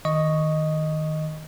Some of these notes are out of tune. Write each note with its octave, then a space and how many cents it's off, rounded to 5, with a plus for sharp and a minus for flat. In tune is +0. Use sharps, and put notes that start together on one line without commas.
D#3 +5 D#5 +0 C#6 +0